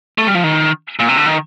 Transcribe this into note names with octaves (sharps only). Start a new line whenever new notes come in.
A3
G3
F3
D#3
A#2
C3
D3
D#3